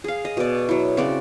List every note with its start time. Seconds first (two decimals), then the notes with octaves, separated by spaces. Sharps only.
0.04 G#4 F5
0.25 D#5
0.37 B2 D5
0.69 F#3 E4
0.97 C#3 C4 F#4 D5